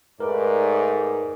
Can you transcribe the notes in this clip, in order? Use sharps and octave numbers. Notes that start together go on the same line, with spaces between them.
G#2 A3 A#4 B4 D5